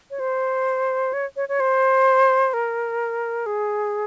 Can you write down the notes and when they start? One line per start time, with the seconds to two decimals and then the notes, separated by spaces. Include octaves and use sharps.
0.11 C#5
0.20 C5
1.13 C#5
1.36 C#5
1.49 C#5
1.60 C5
2.54 A#4
3.46 G#4